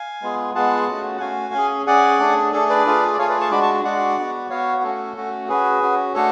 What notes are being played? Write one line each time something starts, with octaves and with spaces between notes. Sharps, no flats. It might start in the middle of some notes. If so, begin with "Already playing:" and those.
Already playing: F5 G#5
G#3 B3 F4 G#4
G#3 B3 F4 G#4 F#5 A5
A3 C#4 F#4
F#5
A3 C#4 F#4 F5 G#5
C#4 G#4
C#4 G#4 D5 F#5
A3 D4 G#4
A3 D4 G#4 A4
B4 D5
A3 F4 G#4
D5
A3 F4 G#4 C#5 F5
B4 D5
A5 C#6
G#3 D4 F#4 B5 D6
A5 C#6
G#3 D4 F#4 D5 F#5
B3 F#4
B3 F#4 C#5 F5
A3 C#4 F#4 A4
A3 C#4 F#4
C#4 F#4 G#4 B4
C#4 F#4
A3 D4 F#4 A4 C#5